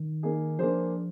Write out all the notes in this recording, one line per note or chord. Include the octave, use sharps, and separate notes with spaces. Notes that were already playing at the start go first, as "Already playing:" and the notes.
Already playing: D#3
A#3 D#4 G#4
F3 A#3 D4 G#4 C5